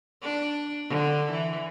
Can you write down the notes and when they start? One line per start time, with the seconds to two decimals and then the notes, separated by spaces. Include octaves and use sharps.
0.22 D4
0.89 D3
1.31 E3